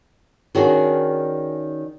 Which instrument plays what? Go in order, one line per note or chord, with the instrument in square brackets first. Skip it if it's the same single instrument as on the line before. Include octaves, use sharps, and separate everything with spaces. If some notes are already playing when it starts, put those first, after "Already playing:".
[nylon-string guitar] D#3 C#4 D4 F#4 G#4